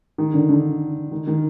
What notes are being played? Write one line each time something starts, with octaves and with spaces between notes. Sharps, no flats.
D#3
D3
D3
D#3
D#3